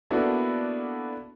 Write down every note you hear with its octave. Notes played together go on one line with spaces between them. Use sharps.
A#3 B3 D4 E4 F#4 A4